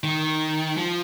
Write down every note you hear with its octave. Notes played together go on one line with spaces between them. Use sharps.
D#3
F3